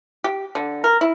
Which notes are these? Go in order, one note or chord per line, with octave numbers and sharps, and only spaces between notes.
G4
D3
A#4
E4